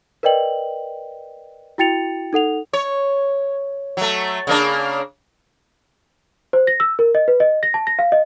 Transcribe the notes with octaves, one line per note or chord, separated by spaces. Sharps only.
A#4 B4 D5 D#5 G5 F#7
E4 F#4 G5 A6 C#7 F7
D#4 A4 F#5 F7
C#5
F#3 A3
C#3 A#3 D4
C5
A#6
E6
A#4
D#5
B4
D#5
A#6
A5
A#6
F5
D#5